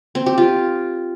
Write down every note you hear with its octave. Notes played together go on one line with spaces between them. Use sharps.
C4
G4
F4